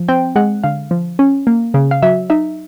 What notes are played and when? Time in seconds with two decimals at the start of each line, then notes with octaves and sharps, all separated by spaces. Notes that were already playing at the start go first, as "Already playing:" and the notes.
Already playing: F3
0.08 C4 G5
0.36 G#3 F#5
0.64 D3 F5
0.91 F3
1.19 C#4
1.47 A#3
1.74 C#3
1.91 F5
2.02 F#3 E5
2.30 D#4 E5